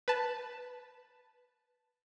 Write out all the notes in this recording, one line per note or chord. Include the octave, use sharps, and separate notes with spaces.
B4 A5